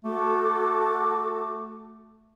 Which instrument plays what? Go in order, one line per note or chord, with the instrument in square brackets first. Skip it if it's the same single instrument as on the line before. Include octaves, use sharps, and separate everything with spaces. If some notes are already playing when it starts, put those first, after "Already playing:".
[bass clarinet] A3 [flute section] F#4 A4 D6